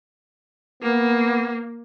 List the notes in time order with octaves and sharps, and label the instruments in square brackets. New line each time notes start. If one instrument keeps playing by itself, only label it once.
[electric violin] A#3 [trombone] B3